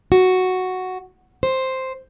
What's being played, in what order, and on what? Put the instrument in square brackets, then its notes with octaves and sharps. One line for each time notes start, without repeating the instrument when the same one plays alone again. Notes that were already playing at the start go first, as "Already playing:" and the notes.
[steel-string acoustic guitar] F#4
C5